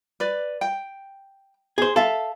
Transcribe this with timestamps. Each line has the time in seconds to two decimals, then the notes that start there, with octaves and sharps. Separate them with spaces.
0.20 B4 D5
0.61 G5
1.78 G#4 C5
1.96 A4 E5 F5